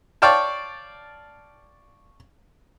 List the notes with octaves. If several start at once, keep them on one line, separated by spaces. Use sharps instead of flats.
C#5 D5 F5 G5 A5